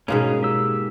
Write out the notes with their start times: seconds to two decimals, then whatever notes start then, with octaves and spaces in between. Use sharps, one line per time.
0.08 G#2 B2 A#3 C#4 D#4 G#4
0.43 G4 E6